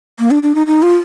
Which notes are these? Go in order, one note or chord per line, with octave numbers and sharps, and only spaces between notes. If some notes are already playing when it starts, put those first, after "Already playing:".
A#3
D4
D4
D#4
D#4
F4